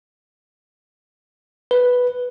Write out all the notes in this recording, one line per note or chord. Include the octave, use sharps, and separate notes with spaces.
B4